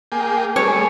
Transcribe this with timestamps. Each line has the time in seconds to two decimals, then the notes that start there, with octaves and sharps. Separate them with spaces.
0.12 A#3 G#4 G5
0.56 G3 A3 G#4 C#5